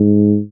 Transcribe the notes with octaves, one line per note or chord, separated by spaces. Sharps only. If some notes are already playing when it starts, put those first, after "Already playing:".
Already playing: G#2